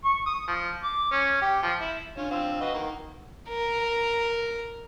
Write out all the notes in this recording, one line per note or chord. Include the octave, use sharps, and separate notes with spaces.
C#6
D#6
F3
D6
C#4
G4
F3
E4
C#4 D4 F4
F3 C4 F5 E6
F#4 B4 D#5 F#5
D#3 A#3
A#4